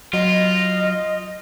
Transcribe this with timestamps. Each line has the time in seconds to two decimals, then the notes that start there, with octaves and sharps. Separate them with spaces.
0.13 F#3 F4 D#5